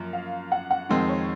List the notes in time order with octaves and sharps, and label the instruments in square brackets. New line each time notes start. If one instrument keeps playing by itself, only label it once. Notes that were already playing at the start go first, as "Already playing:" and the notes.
Already playing: [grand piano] F#2 F3 A#3
[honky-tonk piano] F5
F#5
F#5
[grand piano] F2 D#3 G#3 C4
[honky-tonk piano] C#5